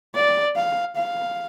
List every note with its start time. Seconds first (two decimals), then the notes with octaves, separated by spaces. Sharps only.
0.15 D5
0.56 F5
0.96 F5